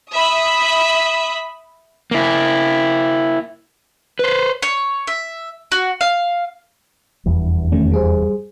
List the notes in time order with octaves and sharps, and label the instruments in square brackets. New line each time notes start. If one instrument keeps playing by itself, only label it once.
[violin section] E5 B5 D#6
[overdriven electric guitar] A#3 E4
B4 C5
[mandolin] C#5
E5
F#4
F5
[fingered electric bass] F1 E2 G2
[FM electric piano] D#3 A3 C#4
G3 G#4 C5